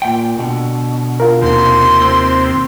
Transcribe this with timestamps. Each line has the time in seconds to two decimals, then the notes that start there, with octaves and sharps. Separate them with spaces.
0.02 A#2 G5
0.38 B2 D3
1.20 F4 A#4
1.42 D#2 C3 C6
2.02 C4